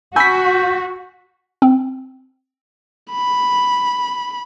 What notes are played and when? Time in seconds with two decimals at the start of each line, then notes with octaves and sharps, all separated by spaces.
0.16 F#4 G#5 B5 E6 G6 B6
1.62 C4
3.11 B5